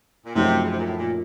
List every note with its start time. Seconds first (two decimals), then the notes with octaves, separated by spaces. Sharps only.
0.25 A#2
0.34 F#2 C3 F3 A3 D#4 F#4
0.63 C#3
0.70 C3
0.79 A#2
0.85 A2
0.98 A#2